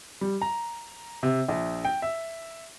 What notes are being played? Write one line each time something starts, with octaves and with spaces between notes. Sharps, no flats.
G3
A#5
C3
A#1
G5
E5